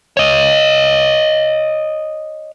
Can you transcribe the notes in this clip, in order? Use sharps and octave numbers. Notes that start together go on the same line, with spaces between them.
C#5 D#5